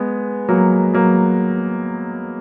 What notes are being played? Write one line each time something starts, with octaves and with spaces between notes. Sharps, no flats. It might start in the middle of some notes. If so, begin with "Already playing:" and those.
Already playing: G#3 B3
F#3 A#3
F#3 A#3